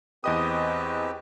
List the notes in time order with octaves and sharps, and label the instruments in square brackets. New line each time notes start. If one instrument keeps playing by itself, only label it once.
[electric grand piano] E2 D#5 D#6 [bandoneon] C4 G4 B4